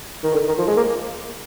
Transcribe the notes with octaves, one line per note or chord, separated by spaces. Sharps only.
D#3
D3
D#3
F3
G#3
A#3